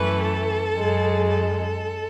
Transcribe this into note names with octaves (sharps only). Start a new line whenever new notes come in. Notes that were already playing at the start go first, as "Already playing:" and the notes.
Already playing: F#2 E3 A3 B4
A4
F#2 C#3 G#3
A4